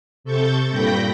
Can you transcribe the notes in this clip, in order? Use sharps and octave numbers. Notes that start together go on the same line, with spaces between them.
C3 A4 C#6 G6 A6
G2 A#2 G5 B5 G6 A#6